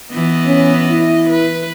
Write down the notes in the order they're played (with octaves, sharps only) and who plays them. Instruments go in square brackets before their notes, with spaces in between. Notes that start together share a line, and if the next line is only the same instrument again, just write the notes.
[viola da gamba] E3 B3 D#5
[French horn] C#4
E4
[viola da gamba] B4